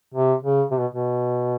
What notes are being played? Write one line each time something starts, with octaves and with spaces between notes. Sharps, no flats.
C3
C#3
C3
B2
B2